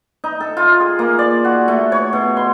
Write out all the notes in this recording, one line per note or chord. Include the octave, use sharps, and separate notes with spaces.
D#4
A4
F4
G#4
A#3
D5
F#4
A3
C#5
B2
C6